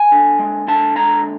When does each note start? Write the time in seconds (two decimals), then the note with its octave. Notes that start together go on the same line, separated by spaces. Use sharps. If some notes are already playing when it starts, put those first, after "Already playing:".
Already playing: G#5
0.12 D3
0.39 G#3
0.67 D3 A5
0.96 G#3 A#5